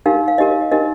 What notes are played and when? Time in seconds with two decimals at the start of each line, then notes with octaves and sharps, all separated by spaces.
0.06 D#4 G4 A#4 F5
0.28 F5
0.38 D#4 G4 A#4 D#5
0.72 D#4 G4 A#4 D#5